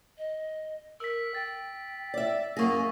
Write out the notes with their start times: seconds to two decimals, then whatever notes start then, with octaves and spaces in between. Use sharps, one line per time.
0.18 D#5
1.00 A#4 E6 B6
1.35 G5 A6
2.14 D5 E5
2.57 F#2 A#3 G#4 C#6 A#6